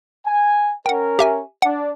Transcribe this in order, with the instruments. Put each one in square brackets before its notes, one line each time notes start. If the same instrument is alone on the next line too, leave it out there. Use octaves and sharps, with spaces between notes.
[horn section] G#5
[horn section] C#4 A#4 [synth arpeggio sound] F#5 G5
[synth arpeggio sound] G4 E5 G#5
[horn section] D4 [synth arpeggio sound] F#5